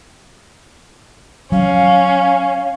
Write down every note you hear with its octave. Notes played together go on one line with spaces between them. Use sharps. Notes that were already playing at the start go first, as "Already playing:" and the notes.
F#3 C#4 F5